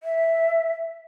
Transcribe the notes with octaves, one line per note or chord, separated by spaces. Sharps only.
E5